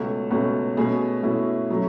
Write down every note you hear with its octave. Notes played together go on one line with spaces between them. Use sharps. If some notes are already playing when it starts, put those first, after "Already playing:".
Already playing: C#2 B2 A3 C#4 A4
C#2 B2 A3 C#4
B2 A3 C#4 G#4
B2 A3 C#4 E4
B2 F#3 A3 C#4